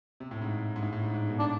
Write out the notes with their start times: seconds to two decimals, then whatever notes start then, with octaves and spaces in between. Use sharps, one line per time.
0.20 C3
0.31 A2
0.42 G#2
0.76 G#2
0.82 A2
0.92 A2
1.03 G#2
1.14 G#2
1.29 B2
1.39 D4